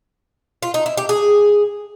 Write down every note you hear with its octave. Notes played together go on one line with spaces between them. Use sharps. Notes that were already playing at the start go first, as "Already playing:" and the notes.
F4
D#4
E4
G4
G#4